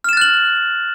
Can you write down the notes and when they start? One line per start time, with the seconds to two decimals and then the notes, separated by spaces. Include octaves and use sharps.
0.04 F6
0.09 E7
0.13 A6
0.17 F#6
0.21 F#7